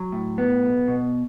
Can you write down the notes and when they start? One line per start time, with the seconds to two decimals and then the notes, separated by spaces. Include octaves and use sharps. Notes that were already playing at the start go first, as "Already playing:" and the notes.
Already playing: F#3
0.12 A2
0.38 B3
0.63 B1
0.88 B2